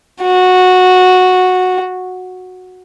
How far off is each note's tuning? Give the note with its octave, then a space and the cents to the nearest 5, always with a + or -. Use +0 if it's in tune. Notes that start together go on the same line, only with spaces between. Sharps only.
F#4 -10